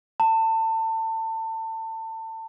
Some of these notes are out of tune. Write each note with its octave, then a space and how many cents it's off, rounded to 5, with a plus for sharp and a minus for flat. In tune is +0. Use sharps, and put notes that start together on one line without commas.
A5 +30